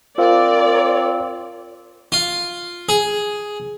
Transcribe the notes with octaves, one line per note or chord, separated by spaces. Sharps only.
C4 F4 A#4 C5 D5 F5
F4
G#4